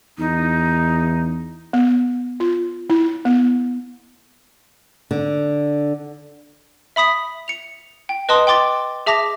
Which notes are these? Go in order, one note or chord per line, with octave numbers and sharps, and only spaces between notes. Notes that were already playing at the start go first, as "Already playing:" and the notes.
E2 D#4
B3
F4
E4
B3
D3
E5 B5 D#6 B6
C#7 F7
G5
B4 D#5 A5 C6 D#6
G5 C6 D6 A6
G#4 E5 A5 D6 A#6 F7